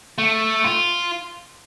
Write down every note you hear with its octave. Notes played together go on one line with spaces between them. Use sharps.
A3
F4